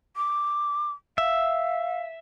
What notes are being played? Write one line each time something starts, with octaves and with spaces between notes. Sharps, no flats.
D6
E5 F5